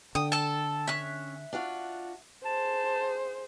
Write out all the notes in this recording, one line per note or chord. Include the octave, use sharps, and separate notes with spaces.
D3 G5 D#6
A4 A5
C#4 E5 F#6
D4 F4 F#4
G#4 C5 A5